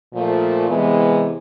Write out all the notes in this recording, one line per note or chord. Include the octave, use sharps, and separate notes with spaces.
A#2 F3 A3
C3 E3 G#3 B3